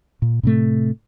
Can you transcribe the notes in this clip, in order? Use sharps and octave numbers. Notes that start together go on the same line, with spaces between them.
A#2
A2 C3 A3